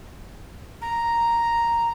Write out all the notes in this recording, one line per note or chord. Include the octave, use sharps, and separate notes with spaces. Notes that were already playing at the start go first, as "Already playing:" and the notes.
A#5